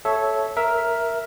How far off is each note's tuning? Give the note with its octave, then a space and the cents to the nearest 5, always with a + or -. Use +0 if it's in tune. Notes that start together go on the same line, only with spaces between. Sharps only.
A4 -15 C#5 +0 E5 +0
A#4 +5 E5 +0